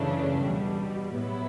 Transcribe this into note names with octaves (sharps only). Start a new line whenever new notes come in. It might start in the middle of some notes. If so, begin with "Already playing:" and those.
Already playing: F#2 C#3 E3 A3 D4
E2 B2 G3
A2 F#3 B3 E4